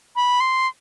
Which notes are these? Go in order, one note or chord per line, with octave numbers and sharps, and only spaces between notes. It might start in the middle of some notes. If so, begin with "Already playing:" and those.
B5
C6